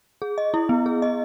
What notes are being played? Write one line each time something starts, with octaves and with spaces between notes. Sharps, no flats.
G#4
D#5
E4
B3
G#4
D#5